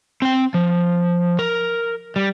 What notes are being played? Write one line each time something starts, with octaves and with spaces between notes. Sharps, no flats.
C4 G5
F3
A#4
G3